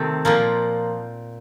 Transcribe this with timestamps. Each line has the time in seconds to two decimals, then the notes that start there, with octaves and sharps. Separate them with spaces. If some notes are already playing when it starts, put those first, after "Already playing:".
Already playing: C3 D#3 A3 C4
0.25 A#2 F3 A#3